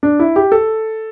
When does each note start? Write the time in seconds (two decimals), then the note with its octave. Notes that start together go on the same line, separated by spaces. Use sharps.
0.03 D4
0.19 E4
0.36 G4
0.52 A4